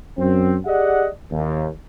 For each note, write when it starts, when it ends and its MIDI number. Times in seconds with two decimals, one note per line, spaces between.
0.18 0.55 42
0.18 0.55 60
0.66 1.06 67
0.66 1.06 68
0.66 1.06 74
0.66 1.06 75
0.66 1.06 78
1.31 1.67 39